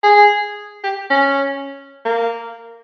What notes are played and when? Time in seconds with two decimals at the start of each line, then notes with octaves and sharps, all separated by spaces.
0.03 G#4
0.84 G4
1.10 C#4
2.05 A#3